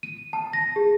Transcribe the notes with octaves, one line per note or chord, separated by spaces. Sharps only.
D#7
A5
A#6
G#4